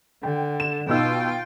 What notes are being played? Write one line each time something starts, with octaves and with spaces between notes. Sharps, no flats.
D3 G5
E7
B2 D#4 F4 G5 E6